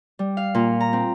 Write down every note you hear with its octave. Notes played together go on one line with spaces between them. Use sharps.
G3
F5
A#2
A#5
C4